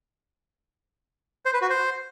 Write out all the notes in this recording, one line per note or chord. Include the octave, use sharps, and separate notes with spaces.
C5
B4
F#4
C5